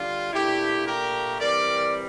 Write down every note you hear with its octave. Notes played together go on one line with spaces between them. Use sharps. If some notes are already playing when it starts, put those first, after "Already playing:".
Already playing: D3 G3 D4 F4
A#2 A3 D4 E4 G4
G4 A#4
E3 G3 C4 A#4 D5